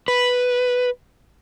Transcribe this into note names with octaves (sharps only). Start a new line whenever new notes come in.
B4